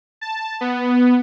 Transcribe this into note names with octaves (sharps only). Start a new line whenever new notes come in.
A5
B3